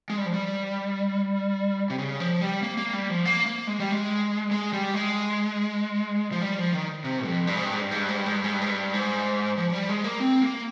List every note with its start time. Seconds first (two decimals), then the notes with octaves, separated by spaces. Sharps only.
0.10 G#3
0.18 G3
0.26 F3
0.34 G3
1.90 C3
1.98 C#3
2.20 F3
2.41 G3
2.63 A#3
2.77 A#3
2.93 G3
3.09 F3
3.25 A#3
3.46 A#3
3.67 G#3
3.80 G3
3.91 G#3
4.51 G#3
4.73 G3
4.94 G#3
6.32 F3
6.41 G3
6.58 F3
6.73 D#3
7.04 C3
7.26 F2
7.47 G2
7.56 G#2
7.65 G2
7.73 G#2
7.82 G2
7.91 G#2
8.00 G2
8.09 G#2
8.17 G2
8.26 G#2
8.35 G2
8.44 G#2
8.53 G2
8.61 G#2
8.70 G2
8.94 G#2
9.58 F3
9.69 F3
9.73 G3
9.89 G#3
10.04 A#3
10.20 C4
10.42 A#3